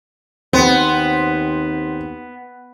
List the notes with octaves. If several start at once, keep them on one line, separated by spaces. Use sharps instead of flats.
D#2 B3 C4